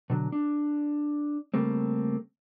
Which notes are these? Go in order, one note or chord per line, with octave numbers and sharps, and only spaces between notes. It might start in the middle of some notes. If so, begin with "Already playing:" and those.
B2 D3 F#3
D4
C#3 G3 A3 A#3 C4